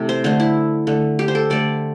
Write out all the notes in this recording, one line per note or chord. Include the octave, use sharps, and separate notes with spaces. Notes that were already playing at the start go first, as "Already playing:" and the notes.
Already playing: C3 E3 A3
C5
D3 A3 C5
E4
D3 A3
G4
C5
A4
D3 A3 D5